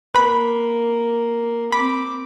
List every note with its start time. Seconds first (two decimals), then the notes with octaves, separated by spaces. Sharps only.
0.15 A#3 B4 B5
1.72 C4 B5 D6